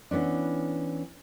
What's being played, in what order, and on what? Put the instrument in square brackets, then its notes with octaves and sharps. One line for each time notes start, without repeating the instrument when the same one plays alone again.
[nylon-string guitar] E3 B3 C#4 D4